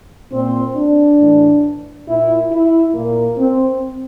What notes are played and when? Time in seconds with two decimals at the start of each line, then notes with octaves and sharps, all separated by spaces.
0.32 A#2 C4
0.75 D4
1.19 A2 E3
2.07 A#2 E4
2.51 E4
2.94 A#2 A#3
3.38 C4